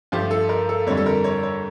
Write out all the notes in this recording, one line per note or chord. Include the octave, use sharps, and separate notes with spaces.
G2 F3 A3 G4
A4
A#4
A4
F2 D3 G3 C#5
A4
A#4
C#5
C#5